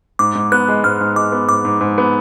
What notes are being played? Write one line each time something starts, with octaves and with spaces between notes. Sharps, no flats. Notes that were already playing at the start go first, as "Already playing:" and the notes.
G#2 D6
G#2
B3 F#6
G#3
G#2 F6
G#2
G#3 D6
B3
G#2 D6
G#2
G#2
B3